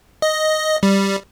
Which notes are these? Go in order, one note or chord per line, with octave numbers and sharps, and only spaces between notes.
D#5
G3